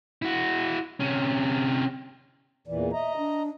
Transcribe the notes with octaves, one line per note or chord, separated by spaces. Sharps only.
E4 F#4
C3 C#4
E2 A#2 E3 D5
D#5 E5 A#5
D4